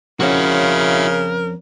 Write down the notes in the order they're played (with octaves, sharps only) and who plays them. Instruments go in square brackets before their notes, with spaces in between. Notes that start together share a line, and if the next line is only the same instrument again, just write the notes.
[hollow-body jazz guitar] F2 C#4 [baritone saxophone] C#3 [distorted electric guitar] E4 F#4 [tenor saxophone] A#4